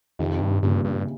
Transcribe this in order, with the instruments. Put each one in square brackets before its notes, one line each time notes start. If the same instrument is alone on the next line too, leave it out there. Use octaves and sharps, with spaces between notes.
[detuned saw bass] F2 [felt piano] C3 D#3
[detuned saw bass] G2
[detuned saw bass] G2 [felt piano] A#2 C#3
[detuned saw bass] G2